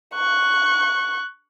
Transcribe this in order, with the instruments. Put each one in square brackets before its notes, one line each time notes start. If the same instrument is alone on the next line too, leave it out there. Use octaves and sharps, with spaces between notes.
[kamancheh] C#6 F#6